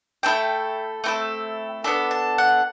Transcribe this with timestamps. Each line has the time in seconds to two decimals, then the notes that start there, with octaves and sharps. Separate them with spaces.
0.23 A3 C4 E4 A4 G5
1.04 A3 C4 E4 A4
1.84 B3 D4 A4 B5
2.11 A5
2.38 F#5